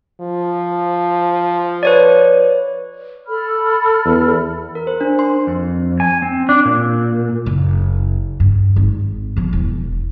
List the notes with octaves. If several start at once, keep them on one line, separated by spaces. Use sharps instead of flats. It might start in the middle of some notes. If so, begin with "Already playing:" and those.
F3
B4 C#5 D5
A4 B5 F6
E2
A#4
C5
D4
C6
F2
G#5
C4
D4
A#2
F#1
G2
G#1
B2 F3
E1